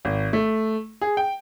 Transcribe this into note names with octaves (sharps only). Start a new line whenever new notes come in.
G#1
A3
G#4
G5